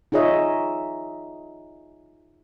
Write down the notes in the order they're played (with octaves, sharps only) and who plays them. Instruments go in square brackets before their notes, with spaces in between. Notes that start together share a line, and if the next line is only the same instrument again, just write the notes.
[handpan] D#4 F4 G#4 C#5 D#5 E5